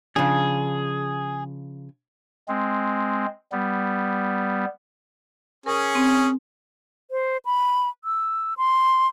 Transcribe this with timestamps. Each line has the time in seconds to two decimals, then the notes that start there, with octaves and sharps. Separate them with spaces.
0.16 C#3 F3 D4 G#4
2.48 G#3 C4
3.52 G3 B3
5.66 C#4 G#4 A#4 G#5
5.95 C4
7.11 C5
7.45 B5
8.04 E6
8.57 C6